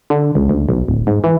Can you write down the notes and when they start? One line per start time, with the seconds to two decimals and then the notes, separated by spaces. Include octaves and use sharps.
0.10 D3
0.35 C#2
0.49 D2
0.69 B1
0.88 D1
1.07 G#2
1.24 E3